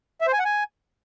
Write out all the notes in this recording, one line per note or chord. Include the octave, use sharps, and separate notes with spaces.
E5
C5
G#5
F#5
G#5